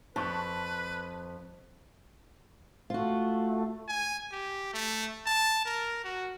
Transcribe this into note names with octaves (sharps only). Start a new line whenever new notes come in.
F2 B4 A5 C#6 F#6
A3 F4 F#4
G#5
G4
A3
A5
A#4
F#4